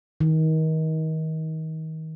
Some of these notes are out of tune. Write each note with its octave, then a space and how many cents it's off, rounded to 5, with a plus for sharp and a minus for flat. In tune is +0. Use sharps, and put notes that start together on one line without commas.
D#3 +30